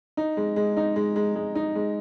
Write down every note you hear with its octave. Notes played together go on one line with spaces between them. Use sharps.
D#4
G#3
G#3
D#4
G#3
G#3
G#3
D#4
G#3